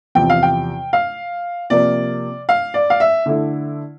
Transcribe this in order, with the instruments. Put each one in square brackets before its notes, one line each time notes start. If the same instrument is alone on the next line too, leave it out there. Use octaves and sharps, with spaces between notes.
[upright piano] E2 C3 F3 G5
F5
G5
F5
C3 F3 A#3 D5
F5
D5
F5
E5
D3 A3 E4